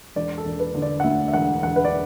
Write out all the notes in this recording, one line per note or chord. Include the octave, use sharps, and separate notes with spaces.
E1 D5
A4
E1
B4
D3
D5
F#5
D2 E5
E5
E1 F#5
E1 F#5
B4
D5